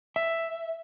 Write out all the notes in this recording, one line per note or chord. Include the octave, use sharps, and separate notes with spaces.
E5